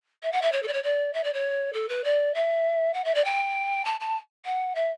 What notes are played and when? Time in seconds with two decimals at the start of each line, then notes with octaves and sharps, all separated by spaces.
0.23 E5
0.32 F#5
0.42 E5
0.52 C#5
0.63 A4
0.68 D5
0.73 C#5
0.83 D5
1.13 E5
1.24 D5
1.33 C#5
1.73 A4
1.89 B4
2.04 D5
2.34 E5
2.94 F#5
3.04 E5
3.15 D5
3.24 G5
3.85 A5
4.00 A5
4.45 F#5
4.75 E5